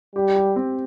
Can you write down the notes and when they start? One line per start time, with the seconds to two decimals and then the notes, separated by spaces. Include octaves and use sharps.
0.16 G3 G4
0.36 G4
0.56 C4